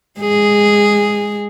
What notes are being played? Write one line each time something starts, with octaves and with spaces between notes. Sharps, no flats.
G#3 G#4